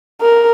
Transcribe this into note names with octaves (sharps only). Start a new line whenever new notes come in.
A#4